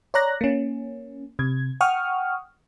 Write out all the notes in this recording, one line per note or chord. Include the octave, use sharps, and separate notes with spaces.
C#5 D5 A#5 F#6 A#6
A#3 C#4
C3 G#6
F#5 G5 C#6 D#6 F6